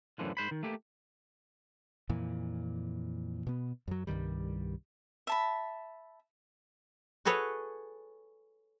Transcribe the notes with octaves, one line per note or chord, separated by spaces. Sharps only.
F#2 A2 D3 E3 F3
G#2 C5 B5
D#3
A3 A#3 G4
F2 A#2 E3
B2 B3
F#2 F#3
C2 G2 D#3 G3
E5 A5 B5
F#4 G#4 A4 B4 C#5